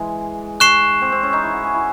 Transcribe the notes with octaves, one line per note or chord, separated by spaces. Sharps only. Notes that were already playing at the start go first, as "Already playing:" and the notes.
Already playing: E3 G#3
C#6 F#6 C7 E7
C4
C4
C#4
D#4
E4
F#4
G#4
E4